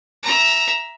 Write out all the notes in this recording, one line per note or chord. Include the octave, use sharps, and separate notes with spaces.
E5 A#5